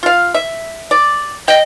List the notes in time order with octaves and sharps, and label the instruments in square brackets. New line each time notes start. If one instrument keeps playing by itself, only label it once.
[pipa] F4 F5
E5
D5
[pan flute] D#5 [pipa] G5